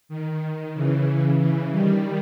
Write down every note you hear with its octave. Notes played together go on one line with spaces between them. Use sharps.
D#3
C#3 E3
C#3 E3
D#3 G3